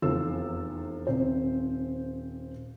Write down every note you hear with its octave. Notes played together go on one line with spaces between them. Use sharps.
F1 E2 F4 A4 E6
D#1 C4 C5